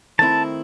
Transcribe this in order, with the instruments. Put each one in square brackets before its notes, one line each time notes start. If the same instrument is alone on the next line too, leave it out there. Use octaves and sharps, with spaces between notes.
[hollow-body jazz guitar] D#3 A3 C4 E4 [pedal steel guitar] A5